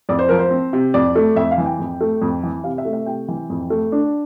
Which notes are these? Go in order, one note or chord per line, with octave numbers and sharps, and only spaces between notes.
F2 D5
C5
F3 A#4
C5
C4
C3
F2 D5
A3
F2 E5
F5
E3
G5
F2
A3
F2
E3
C3 F5
E5
A3
E5
C3 G5
E3
F2
A3
D4